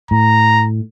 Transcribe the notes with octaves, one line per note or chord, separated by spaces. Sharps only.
A2 A#5